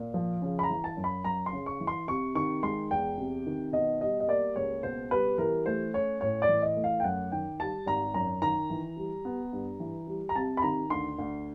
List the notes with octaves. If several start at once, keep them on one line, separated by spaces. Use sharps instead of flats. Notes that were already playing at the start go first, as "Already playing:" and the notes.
Already playing: A#2
F3
C#3
B5
A#5
E3
A5
F#2
B5
F#2 A#5
C6
C#3
C#6
E3
C6
C3 C#6
D#3 C#6
G#3 C6
E2 G5
C3
D#3
B2 D#5
G3 D#5
D#5
A#3 D5
C#2 C#5
B2 C5
G3 B4
E3 A#4
A3 C5
C#4 C#5
A2 C#5
D5
E3
D#5
A3
F5
G5
F#2 F#5
D#3 G5
G3 A5
G#1 A#5
F#2 A#5
D#3 A#5
E3
G3
B3
G2
E3
G3
A#5
C3 A5
B5
D#3 A#5
D2 C6
D2